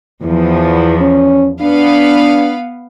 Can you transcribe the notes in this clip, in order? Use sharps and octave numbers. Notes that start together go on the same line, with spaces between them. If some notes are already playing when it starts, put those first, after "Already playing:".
E2 E3 F3
C#4
B3 D4 B4 F5